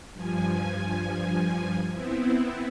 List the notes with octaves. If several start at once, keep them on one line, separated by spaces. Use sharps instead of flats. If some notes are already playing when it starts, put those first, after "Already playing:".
G2 F3 G#5
B3 C4 E4